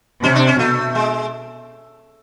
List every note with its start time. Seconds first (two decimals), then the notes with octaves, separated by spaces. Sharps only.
0.23 C3 C#4
0.35 D4
0.47 C#4
0.59 B2 A3
0.95 G#3